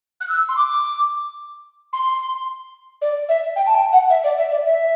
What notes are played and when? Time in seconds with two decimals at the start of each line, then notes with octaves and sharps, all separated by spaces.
0.21 F#6
0.29 E6
0.49 C6
0.57 D6
1.93 C6
3.01 D5
3.29 E5
3.56 G5
3.66 A5
3.74 G5
3.92 F#5
4.10 E5
4.24 D5
4.38 E5
4.51 D5
4.65 E5